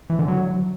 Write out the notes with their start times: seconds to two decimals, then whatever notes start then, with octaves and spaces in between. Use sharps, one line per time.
0.10 E3
0.19 D3
0.28 F#3